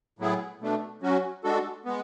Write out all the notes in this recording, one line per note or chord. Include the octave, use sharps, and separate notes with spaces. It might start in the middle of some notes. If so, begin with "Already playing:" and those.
A2 F#3 B3 E4 G#4
B2 A3 D4
F#3 C#4 F#4
G#3 D4 F#4 A4
G#3 B3